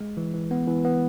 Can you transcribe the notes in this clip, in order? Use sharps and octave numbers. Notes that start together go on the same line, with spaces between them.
G#3
E3
E3
B3
E3
B3